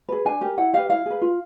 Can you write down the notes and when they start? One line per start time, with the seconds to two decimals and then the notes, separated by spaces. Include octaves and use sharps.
0.09 G#4 B4
0.25 D4 G#5
0.41 G4 A#4
0.57 E4 F#5
0.73 G4 B4 F5
0.89 E4 F5
1.06 G#4 B4
1.21 F4